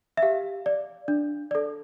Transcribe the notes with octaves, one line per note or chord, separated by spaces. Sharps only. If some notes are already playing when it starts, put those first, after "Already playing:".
E5
G4 F5
D5
D4
A4 D5